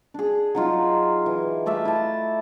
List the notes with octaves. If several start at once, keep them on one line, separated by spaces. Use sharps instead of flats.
D4 G#4
F#3 D#4 F4
E3
A3 D5 E5 F5
E4 A5